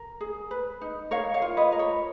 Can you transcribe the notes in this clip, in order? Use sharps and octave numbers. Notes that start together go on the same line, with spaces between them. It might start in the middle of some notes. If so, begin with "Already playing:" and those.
Already playing: A#4
G#4
B4
D#4
A#4 C#5 F5
C#5 F5
F4
B4 D#5
A#4
C#5